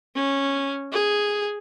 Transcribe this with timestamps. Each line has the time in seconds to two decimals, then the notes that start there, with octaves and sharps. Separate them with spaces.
0.15 C#4
0.92 G#4